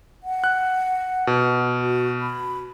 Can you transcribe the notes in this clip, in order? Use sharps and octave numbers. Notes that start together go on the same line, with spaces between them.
F#5
F#6
B2
F#4
B5